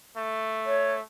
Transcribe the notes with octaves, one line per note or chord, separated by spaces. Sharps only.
A3
C#5